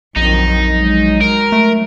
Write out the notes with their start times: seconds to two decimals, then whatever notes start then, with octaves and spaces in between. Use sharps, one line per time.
0.16 A#1 F2 D#3 F#3 D#4
0.70 F#3 G#3
1.21 A#4
1.52 A3